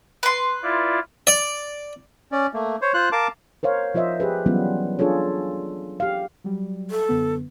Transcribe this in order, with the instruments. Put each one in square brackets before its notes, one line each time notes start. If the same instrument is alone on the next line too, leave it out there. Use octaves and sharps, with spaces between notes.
[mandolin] B4 C6
[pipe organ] E4 F4 D5
[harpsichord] D5
[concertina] C#4 D5
A3 A#3
C5 C#5
F4 C5 F#6
A#4 F5 A5 D6
[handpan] A#4 C5 C#5 F5
F3 F4 C5 D#5 E5
G4 G#4 B4
E3 F#3 G3 B3 C#4 F4
D4 F4 G#4 A4 C#5
G4 F5
[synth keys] F#3 G3
[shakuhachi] A4
[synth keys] F#2 D3 B3